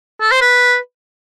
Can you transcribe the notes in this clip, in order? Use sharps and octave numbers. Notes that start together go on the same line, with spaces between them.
A4
C5
B4